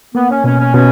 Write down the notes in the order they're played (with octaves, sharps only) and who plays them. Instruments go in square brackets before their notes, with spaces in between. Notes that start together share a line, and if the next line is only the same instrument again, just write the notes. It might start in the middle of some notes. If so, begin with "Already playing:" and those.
[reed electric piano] A#3 [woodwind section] B3
[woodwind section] C#4
[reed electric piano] B2 [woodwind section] C#4
[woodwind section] C#4
[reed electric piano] B2 [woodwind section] C#4